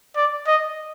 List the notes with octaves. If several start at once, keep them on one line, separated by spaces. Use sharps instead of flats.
D5
D#5